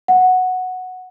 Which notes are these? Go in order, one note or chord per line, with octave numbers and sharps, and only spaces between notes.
F#5